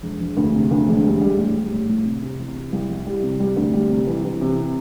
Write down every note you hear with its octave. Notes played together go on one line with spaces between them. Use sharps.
E1
E1
D2
C3
D2
E1
G3
G3
A2
G3
A2
A2
C3
C3
E3
C3
C2
C2
G3
C3
G3
D2
G3
C3
E3
E3
C3